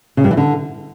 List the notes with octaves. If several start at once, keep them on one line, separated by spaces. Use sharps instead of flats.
C#3
G2
E3
D3